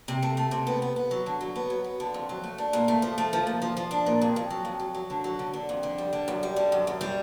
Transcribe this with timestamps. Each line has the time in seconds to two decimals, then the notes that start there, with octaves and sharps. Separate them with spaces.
0.08 C3
0.22 A3
0.37 A3
0.51 C3
0.67 B3
0.82 B3
0.96 B3
1.11 F#3
1.26 D3
1.41 F#3
1.56 B3
1.70 F#3
1.84 B3
2.00 D3
2.14 F2
2.29 F#3
2.44 A3
2.58 D4
2.73 A#2
2.88 A3
3.02 F3
3.18 A3
3.33 F3
3.47 A#2
3.62 F3
3.77 F3
3.91 D4
4.06 A#2
4.21 F2
4.36 F2
4.50 F#3
4.65 F2
4.79 F#3
4.95 F#3
5.10 D3
5.24 F#3
5.39 D3
5.53 D3
5.69 F2
5.83 D3
5.98 G3
6.13 D3
6.28 F#2
6.43 G3
6.56 D3
6.72 F#2
6.87 F#2
7.01 G3